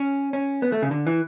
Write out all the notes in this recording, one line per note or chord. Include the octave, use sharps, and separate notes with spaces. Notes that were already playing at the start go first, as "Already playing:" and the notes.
Already playing: C#4
C#4
B3
A3
C#3
D3
E3